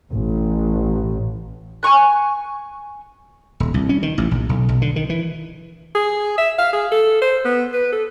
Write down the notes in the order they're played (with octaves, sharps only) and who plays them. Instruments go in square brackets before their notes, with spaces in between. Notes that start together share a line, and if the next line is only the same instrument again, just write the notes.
[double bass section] A1
[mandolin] G#5 A#5 C#6 F#6
[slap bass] D#1
C2
C#4
D#3
A1
A#1
B1
B1
D3
D#3
E3
[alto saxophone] G#4
E5
F5
G#4
A4
C5
B3
B4
A4